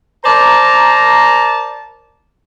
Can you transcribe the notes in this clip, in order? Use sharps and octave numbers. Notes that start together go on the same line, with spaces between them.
A#4 C5 D5 A5 A#5